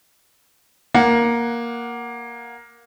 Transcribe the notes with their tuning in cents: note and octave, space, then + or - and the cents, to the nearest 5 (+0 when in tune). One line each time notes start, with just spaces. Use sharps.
A#3 +10 F#5 +0